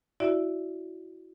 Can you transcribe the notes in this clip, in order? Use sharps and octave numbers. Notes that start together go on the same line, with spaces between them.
E4 F#4 D5 E5